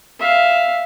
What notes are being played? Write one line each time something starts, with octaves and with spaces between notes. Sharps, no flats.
E5 F5